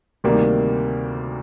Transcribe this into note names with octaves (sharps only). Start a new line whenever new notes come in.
D2 C3 D#3 G3 A#3